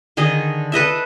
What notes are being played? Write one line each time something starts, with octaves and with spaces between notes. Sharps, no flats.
D3 D#3 G#4 D#5
A4 B4 D#5 E5